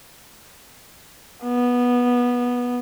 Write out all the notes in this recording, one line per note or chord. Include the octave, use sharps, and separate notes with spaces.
B3